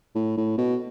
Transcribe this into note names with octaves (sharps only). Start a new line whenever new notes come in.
A2
A2
B2